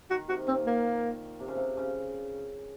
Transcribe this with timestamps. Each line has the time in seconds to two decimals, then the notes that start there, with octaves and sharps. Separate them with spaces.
0.10 D#3 F#4
0.29 C3 F#4
0.47 A#2 C4
0.67 A#3
1.40 C3
1.48 C#3
1.57 C3
1.77 C#3